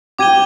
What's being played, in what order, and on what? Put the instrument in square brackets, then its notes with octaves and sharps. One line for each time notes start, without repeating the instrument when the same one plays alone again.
[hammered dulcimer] G4 [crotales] D6 G#6 D#7 G7